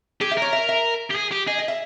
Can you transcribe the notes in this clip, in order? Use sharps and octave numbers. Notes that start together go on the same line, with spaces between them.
G4 G#4
E5
A#4 C#5
E5
E5
G4
G#4
G4
G#4 D#5
D#5
E5